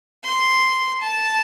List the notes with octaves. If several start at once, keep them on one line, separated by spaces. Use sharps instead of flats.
C6
A5